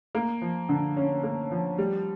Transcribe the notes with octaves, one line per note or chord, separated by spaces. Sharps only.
A#3
F3
D3
C#4
A#3
F3
G3